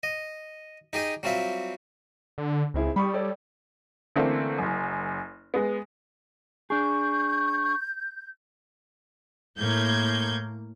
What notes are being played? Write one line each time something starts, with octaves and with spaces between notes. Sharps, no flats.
D#5
D#4 G4 G#4 D#5
F#3 G3 C4 F4 E5
D3
C#2 C4 E4 G#4
G3 B5 C#6 D#6
A4 C#5 D5
D3 E3 A3 A#3 C4 D4
F#1 F#2
G#3 B3
D4 G#4 C#6 G6
A2 A#3 G6 G#6